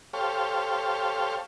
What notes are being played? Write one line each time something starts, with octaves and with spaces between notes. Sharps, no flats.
G4 A4 C5 C#5 F5